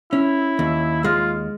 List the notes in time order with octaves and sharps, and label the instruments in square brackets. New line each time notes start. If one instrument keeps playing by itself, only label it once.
[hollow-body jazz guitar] C#4 [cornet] E4
[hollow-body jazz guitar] D#2
[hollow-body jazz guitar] G#3 [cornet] F4